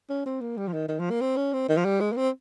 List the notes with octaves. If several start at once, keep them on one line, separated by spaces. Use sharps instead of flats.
C#4
C4
A#3
G3
F3
D#3
D#3
F3
A#3
C4
C#4
C4
D#3
F3
G3
G#3
A#3
C4